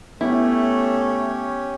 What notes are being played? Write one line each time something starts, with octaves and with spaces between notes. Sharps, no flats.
A3 B3 C#4 E4 G4 C#5